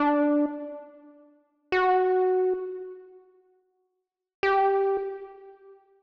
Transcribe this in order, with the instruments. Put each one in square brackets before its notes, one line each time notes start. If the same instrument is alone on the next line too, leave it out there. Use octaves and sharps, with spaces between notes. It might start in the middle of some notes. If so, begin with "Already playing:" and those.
Already playing: [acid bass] D4
F#4
G4